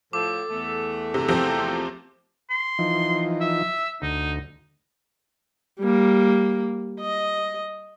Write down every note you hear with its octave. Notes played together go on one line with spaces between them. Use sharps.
A2 F3 A4 D6
E2 A3
C3
C3 F3 C4 G5
C6
E3 F3 D#4
E5
D2 D#4
G3 A#3
D#5